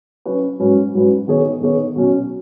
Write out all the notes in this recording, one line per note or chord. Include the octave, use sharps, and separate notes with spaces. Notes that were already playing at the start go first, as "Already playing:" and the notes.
F#3 C#4 F#4 B4
G#2 F#3 C#4 F#4 B4
G#2 F#3 C#4 F#4 B4
D#3 B3 G#4 C#5
D#3 B3 G#4 C#5
B2 F#3 C#4